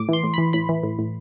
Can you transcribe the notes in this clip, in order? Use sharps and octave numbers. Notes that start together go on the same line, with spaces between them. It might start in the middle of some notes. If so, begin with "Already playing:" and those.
Already playing: A2 D6
E3 C6
A2
E3 B5
A2 B5
E3
A2
A2